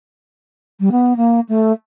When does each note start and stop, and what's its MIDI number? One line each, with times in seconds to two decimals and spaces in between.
0.80 0.89 55
0.91 1.16 59
1.16 1.40 58
1.49 1.72 57